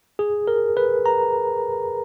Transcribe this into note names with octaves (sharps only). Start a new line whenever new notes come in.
G#4
A#4
B4
A#5